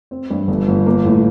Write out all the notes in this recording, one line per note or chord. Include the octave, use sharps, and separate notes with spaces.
C4
G2
G1
G1
A#3
A2